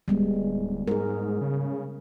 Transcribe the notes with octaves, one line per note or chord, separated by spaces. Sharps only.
D1 G3 G#3 B3
G#2 G#4 A#4
C#3